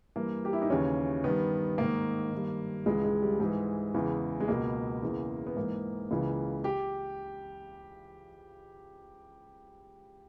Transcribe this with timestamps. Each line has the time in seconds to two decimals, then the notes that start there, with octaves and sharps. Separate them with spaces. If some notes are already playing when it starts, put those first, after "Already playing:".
0.16 G2 E3 A#3
0.45 G4
0.53 E4
0.62 D#4
0.70 D#2 C#3 E3 C#4
1.24 G2 D#3 B3
1.78 G#2 D#3 A#3
2.32 G2 D#3
2.86 C#2 C#3 E3 G#3
3.04 G#3
3.22 G3
3.40 G#2 E3 G#3
3.94 E2 C#3 E3
4.40 G#3
4.48 C#2 B2 A#3
5.02 E2 C#3 E3
5.47 B3
5.56 G#2 E3 A#3
6.11 C#2 C#3 E3
6.64 G4